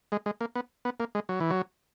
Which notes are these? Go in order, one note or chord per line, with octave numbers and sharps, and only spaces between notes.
G#3
G#3
A#3
B3
B3
A#3
G#3
F#3
E3
F#3